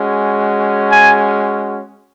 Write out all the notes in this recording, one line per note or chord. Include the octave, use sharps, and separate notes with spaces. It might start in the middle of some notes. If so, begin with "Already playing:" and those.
Already playing: G#3 C#4 F#4
G#5